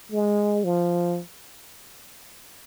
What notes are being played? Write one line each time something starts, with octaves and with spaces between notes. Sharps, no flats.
G#3
F3